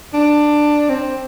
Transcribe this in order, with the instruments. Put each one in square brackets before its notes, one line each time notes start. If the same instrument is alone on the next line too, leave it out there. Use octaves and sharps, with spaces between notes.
[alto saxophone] D4
C4